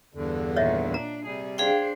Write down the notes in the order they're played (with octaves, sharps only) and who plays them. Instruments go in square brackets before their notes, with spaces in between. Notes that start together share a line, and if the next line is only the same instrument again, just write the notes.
[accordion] E2 G2 D3
[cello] A#2 D#3 [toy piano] C#5 D#5 E5
[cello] D4 [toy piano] A#5
[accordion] C3 G3 [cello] G#4
[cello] D4 C5 [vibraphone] G#4 F5 G5